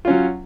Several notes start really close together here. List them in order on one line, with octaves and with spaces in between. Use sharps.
F4 C#4 F#3